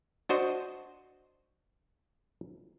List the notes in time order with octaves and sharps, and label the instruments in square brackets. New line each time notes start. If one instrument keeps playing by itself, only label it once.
[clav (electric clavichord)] D4 F#4 C5 D#5